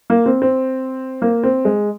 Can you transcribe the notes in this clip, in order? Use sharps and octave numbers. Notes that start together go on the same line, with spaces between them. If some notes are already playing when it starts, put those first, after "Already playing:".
A#3
C4
C4
A#3
C4
G#3